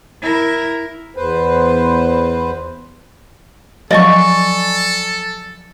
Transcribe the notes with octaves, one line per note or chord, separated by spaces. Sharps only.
E4 A#4
E2 B4 C5
F3 F#3 A4 D5 D#5 G#5 C#6